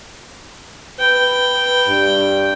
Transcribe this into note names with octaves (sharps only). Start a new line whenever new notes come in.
B4 G5
G2